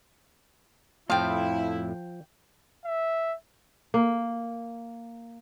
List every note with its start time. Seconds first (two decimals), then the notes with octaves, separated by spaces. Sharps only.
1.10 F2 A2 F3 E4 F5 G5
2.85 E5
3.94 A#3